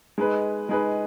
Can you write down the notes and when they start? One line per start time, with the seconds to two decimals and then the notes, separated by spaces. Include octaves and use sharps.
0.18 G#3 D#4 G#4 B4
0.69 G#3 D#4 G#4 B4